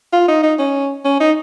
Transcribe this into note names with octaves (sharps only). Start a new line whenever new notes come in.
F4
D#4
D#4
C#4
C#4
D#4